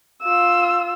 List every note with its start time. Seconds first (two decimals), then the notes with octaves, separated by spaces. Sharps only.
0.22 F4 E6